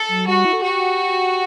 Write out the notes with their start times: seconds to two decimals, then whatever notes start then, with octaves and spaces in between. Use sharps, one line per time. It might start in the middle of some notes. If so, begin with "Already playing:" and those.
Already playing: A4
0.09 F#3
0.27 G3 F#4
0.45 E4
0.53 A4
0.62 F#4 G4